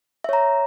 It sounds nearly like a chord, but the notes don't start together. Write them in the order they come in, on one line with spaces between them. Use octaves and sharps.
E5 C#5 A#5